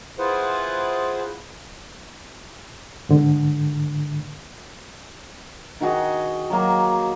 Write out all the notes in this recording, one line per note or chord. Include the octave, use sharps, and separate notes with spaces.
E4 F4 G#4 B4 C5 F#5
G#2 D3
D#3 F#4 G#4 D#5
F#3 A#3